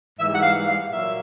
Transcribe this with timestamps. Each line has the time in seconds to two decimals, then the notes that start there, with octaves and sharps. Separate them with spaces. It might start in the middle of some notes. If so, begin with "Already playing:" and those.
0.19 G#2 E3 G3 A#3 E5
0.35 F#5
0.43 F5
0.67 F5
0.91 A#2 F#3 A#3 E5